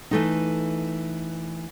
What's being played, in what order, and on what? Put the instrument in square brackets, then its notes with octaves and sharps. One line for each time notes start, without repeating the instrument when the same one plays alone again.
[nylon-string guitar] E3 A3 D#4